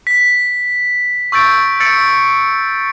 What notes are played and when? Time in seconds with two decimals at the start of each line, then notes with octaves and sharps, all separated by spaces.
0.07 B6
1.32 C#6 E6 G6 A6 D7
1.80 E6 A6 C#7 D7